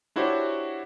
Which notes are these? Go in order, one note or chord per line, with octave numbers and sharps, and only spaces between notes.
D4 E4 F#4 G4 C5 C#5